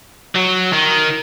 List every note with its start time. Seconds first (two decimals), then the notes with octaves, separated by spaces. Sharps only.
0.35 F#3
0.73 D#3